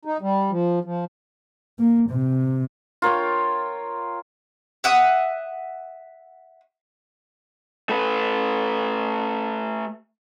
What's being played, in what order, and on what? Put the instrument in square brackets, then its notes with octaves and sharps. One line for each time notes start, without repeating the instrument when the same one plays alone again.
[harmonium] D#4
G3
F3
F3
[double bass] A#3
C3
[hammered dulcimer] F4 A#4 C#5 G5
[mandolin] E5 F#5 D#6
[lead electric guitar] A3 B4